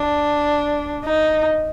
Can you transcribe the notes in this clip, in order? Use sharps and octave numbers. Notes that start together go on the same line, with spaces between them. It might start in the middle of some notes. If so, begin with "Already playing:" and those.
Already playing: D4
D#4